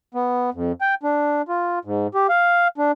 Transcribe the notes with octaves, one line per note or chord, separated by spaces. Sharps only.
B3
F2
G5
D4
F4
G#2
G4
F5
D4